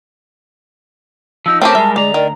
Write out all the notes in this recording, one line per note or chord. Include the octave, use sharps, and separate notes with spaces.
F3 D#4 E6
A3 C4 C#4 G4 A#4 A5
G3 G#3 E5
D2 G#3 D5 A#5
D#3 A#4 D5